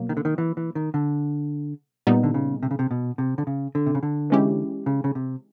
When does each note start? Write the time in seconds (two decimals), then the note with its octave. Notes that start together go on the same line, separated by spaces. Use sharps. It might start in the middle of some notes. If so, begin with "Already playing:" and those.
Already playing: B2 F#3 A#3
0.09 D#3
0.17 D3
0.25 D#3
0.38 E3
0.57 E3
0.75 D#3
0.94 D3
2.07 A#2 G3 B3 D#4
2.23 D3
2.34 C#3
2.63 C3
2.71 C#3
2.79 C3
2.91 B2
3.18 C3
3.38 D3
3.47 C#3
3.75 D3
3.86 C3
3.95 C#3
4.03 D3
4.30 E3 G#3 C#4 E4 G4
4.86 C#3
5.04 C#3
5.15 C3